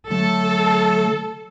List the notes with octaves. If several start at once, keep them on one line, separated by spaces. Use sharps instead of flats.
D3 F#3 A3 A4